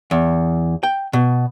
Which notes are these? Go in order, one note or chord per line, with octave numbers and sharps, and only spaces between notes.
E2
G5
B2